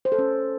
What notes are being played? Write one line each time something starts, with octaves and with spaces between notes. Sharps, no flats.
C5
A4
C#4